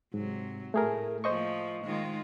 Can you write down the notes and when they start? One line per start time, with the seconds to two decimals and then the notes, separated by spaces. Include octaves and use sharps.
0.14 G#2 C3 F#3
0.74 A2 A3 G#4 A#4
1.24 F3 A3 A#3 C5 D#5 C#6
1.85 D#3 G#3 F4